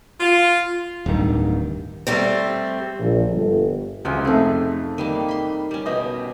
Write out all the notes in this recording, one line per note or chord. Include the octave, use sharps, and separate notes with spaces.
F4
D1 G2 D#3
G3 A3 C4
A#1
G1
C#2 C3 F#3 G5
F2 A3 D#4 G#4
D#3 G3 A#3
B5 C6
G3 C#4
B2 G4 D#5